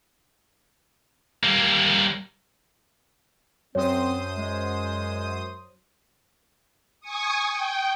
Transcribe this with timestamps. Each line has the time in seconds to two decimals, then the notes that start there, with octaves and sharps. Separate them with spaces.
1.43 G3 A#3
3.75 F#2 C4 C5 C#5 D#6
4.37 G#3
7.01 G#5 C#6 D#6
7.50 G5